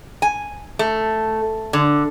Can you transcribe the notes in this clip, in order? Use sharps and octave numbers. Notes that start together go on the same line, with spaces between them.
G#5
A3
D3